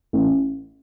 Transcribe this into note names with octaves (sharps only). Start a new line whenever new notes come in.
A1